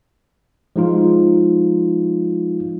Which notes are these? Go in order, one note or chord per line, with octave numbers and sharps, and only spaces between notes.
F3 G#3 D#4 F4